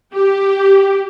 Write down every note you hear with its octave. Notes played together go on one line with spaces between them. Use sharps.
G4